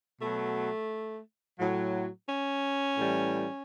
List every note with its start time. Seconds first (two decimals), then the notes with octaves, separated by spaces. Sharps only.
0.20 B2 F#3 A3
1.59 A2 F#3
2.28 C#4
2.97 A2 E3 G3